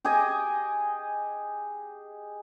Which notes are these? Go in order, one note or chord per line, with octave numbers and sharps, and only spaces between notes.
G4 G#4 D#5 G#5